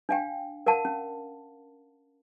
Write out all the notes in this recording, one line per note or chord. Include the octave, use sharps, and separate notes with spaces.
D4 F5 G5
A#4 F5 F#5 A5
C#4